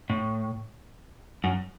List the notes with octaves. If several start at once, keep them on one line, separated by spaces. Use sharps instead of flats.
A2
F#2